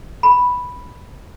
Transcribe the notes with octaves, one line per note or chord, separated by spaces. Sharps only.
B5